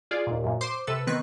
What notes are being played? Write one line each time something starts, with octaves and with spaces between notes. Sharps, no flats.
F4 G#4 D5
D#2 A#2
F#2 A#2
C5 C6 D6
C3 A4 B4 E6
D#3 B3 C4 B4 C#6 F#6